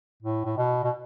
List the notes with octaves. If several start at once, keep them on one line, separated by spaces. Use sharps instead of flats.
A2
A2
B2
B2